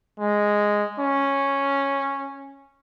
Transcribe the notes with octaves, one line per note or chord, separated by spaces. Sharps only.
G#3
C#4